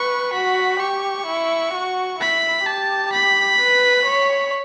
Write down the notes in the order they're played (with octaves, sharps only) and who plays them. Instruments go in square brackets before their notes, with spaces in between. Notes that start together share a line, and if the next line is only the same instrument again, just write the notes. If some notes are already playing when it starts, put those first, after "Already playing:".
Already playing: [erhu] B4 [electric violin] C#6
[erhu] F#4 [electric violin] B5
[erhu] G4 [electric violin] C#6
[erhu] E4
F#4
[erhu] E4 [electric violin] B5
[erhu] G4 [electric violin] A5
[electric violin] B5
[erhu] B4
C#5